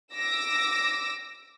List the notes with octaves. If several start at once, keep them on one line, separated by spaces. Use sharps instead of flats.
D6 E6 A#6